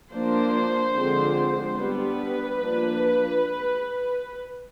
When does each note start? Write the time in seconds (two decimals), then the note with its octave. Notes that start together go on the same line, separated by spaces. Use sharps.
0.12 F3 A#3 D4 C5
0.95 D3 F3 G#3 C4
1.77 G3 B3 D4 B4
2.58 F3 A#3 D4